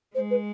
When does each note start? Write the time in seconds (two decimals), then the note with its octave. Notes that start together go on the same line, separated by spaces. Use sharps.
0.15 G#3 C5
0.31 B4